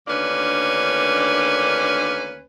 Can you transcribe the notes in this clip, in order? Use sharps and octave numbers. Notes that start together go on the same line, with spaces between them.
D2 D#3 A#3 C#4 D4 B4